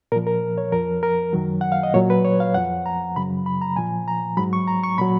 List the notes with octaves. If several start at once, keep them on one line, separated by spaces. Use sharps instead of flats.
A#2 F3 A#4
A#4
C#5
F2 F3 A#4
A#4
F#2 D#3 F#3
F#5
F5
D#5
A#2 F#3 C#5
B4
C#5
F5
F2 F3 F#5
A#5
F#2 C#3 F#3 B5
B5
A#5
A#2 F3 G#5
A#5
G#2 F#3 B5
C#6
A#5
C#6
A#2 F#3 B5